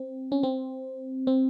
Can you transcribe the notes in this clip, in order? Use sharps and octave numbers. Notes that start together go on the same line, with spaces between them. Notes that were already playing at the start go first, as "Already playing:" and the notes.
Already playing: C4
C#4
C4
C4